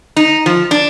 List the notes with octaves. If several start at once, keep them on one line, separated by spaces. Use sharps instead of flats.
D#4
F3
D4